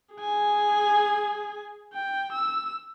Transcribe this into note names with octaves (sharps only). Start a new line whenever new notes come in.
G#4 G#5
G5
E6